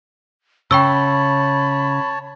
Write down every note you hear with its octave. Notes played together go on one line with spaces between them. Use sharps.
C#3 C#5 G5 A5 B5 C#6 E6